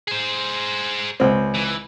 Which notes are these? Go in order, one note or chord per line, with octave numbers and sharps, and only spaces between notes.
G#4 C5
C#2 C4
E3